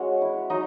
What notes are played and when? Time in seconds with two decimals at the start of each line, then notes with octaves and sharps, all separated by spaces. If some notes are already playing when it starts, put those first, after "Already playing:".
Already playing: G#3 C#4 F#4 C#5 F#5
0.21 E4
0.50 F#3 D#4 D#5